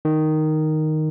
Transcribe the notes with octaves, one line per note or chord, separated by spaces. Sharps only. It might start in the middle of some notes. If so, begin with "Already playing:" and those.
D#3